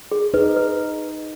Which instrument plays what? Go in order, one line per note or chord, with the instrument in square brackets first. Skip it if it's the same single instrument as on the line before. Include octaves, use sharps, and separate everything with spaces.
[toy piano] G#4
[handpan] D#4 [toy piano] B4
[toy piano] B4